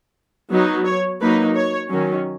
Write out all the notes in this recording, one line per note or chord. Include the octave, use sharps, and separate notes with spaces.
F#3 B3 D#4
C#5
F#3 A#3 D#4 B4
C#5
D#3 F#3 C#4